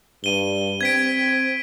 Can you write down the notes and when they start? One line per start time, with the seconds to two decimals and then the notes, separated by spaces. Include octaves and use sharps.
0.24 G2 D#7 G7
0.81 C4 G#6 B6 D7